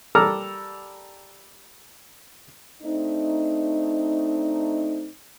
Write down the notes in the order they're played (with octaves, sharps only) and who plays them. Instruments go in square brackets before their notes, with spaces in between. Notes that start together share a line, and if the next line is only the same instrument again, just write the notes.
[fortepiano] G3 A4 A#4 A#5 D6 F6
[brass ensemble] A3 C4 D4 D#4